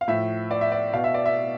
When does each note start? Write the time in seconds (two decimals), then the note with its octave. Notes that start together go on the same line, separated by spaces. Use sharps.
0.01 F5
0.08 A2 F3 E5
0.51 D5
0.61 E5
0.72 D5
0.93 B2 F5
1.04 E5
1.14 D5
1.26 E5